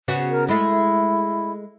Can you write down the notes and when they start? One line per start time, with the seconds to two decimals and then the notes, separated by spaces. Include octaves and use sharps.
0.08 C#3 B3 F#4
0.31 A#4
0.48 G#3 A3 E4